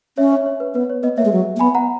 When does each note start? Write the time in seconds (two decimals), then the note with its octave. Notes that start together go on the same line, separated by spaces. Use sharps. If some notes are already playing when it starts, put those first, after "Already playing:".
0.18 C#4 C#5 E5
0.32 C#5 E5
0.46 C#5
0.60 B4
0.74 B3 B4
0.90 C#5
1.03 B3 B4 D#5
1.17 A#3 C#5 E5
1.25 G#3
1.32 F#3
1.56 A#3
1.59 B3 G#5 B5
1.75 F#5 A#5